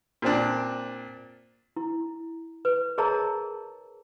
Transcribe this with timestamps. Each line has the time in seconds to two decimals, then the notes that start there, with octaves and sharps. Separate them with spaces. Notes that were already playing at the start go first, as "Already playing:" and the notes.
0.22 A#2 C4 D4
1.77 E4
2.65 B4
2.98 G#4 A#4 C#5 D#5 A5 A#5